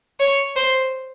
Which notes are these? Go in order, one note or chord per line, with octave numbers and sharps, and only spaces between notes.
C#5
C5